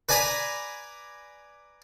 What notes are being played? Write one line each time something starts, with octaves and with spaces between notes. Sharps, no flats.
B4 D5 G#5 A#5 B5